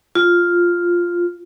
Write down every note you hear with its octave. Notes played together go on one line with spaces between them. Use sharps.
F4